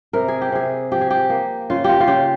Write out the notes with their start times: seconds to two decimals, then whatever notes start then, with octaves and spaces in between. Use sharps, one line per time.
0.13 C3 A#4
0.28 G#4
0.41 G4
0.52 C3 G#4
0.92 F3 G4
1.01 G#4
1.10 G4
1.30 A#3
1.70 C#3 F4
1.84 F4 G4
2.00 F4
2.07 C#3 G4